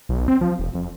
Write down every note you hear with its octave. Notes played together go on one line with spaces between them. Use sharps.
B1
C4
F3
E1
F2